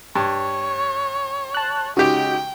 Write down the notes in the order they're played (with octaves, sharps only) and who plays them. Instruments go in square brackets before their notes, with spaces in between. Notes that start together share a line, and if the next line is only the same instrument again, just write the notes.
[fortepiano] G2 [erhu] C#5
[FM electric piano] A5 F#6
[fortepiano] C#3 G#3 G4 [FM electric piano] D#4 F#4 [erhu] G5